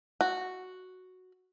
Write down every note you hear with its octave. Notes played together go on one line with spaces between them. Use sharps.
F#4